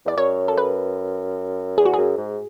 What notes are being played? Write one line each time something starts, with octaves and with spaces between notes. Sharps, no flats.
E2 D5
F#2 C#5
A4
B4
E2 G#4
F#4
F#2 G#4
G#2